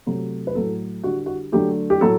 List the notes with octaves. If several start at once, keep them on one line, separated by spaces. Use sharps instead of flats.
C3 F#3 A3
B4
A2 F#3 A3 A4
D3 G3 F#4
F#4
D3 F#3 A3 G4
G4
A2 F#3 A4